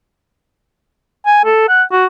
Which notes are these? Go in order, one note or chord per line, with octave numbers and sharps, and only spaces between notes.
G#5
A4
F#5
F#4